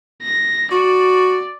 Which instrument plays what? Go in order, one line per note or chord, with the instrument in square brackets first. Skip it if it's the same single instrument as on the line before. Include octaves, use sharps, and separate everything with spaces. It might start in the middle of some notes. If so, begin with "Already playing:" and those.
[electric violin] A#6
[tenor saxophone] F#4 [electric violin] D5